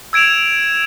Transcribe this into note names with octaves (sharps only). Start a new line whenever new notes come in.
E6 G#6 D7 E7 F7